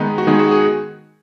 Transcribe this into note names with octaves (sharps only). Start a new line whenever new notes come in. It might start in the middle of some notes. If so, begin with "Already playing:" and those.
Already playing: D#3 G#3 B3 D#4 B4
F#4
D#3 G#3 B3 D#4 G#4
F#4
G#4